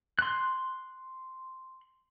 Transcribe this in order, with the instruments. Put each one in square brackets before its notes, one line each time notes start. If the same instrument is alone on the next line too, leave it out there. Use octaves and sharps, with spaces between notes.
[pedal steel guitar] C6 F#6